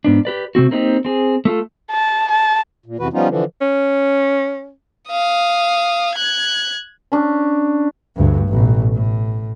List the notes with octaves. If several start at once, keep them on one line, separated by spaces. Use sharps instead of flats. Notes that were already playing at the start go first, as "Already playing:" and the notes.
G#2 B3 D4
G4 B4 D5
C3 A3 C4 F#4
A#3 C4 D#4 F4 G4
C4 G#4
A3 F4 A4
A5
A5
A#2
F2 C3 E3 F#4 B4
F3 G3 B3 C#4 D#4 F4
D3 E3 F3
C#4
F5 D#6
F#6 G#6
C#4 D4
D2 G2
A1 B2
A2